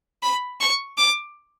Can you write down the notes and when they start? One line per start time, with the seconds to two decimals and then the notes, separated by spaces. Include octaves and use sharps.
0.23 B5
0.60 C#6
0.98 D6